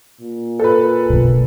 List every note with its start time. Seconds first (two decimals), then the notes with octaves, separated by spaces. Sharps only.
0.21 A#2
0.60 A4 B4
1.10 B2 D3